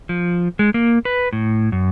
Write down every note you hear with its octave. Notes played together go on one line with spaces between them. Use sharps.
F3
G#3
A#3
B4
A2
F#2